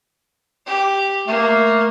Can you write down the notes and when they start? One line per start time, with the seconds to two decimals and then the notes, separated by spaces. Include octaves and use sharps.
0.66 G4
1.27 A3 A#3